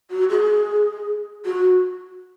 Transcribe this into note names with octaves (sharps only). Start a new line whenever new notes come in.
F#4
G#4
F#4